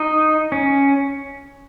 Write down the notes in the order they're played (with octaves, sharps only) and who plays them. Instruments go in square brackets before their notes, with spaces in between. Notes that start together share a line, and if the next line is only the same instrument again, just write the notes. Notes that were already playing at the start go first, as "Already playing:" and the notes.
Already playing: [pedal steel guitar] D#4
C#4